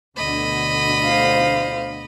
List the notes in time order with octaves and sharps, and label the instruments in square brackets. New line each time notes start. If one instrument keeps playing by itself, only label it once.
[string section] D2 B2 D3 [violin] D#5 B5
[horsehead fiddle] C5 F5